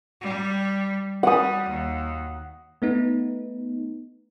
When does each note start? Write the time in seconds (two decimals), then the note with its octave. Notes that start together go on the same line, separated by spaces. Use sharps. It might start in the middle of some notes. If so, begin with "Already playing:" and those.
0.21 G3
1.23 G3 F#5 D#6
1.69 D#2
2.82 A3 B3 D#4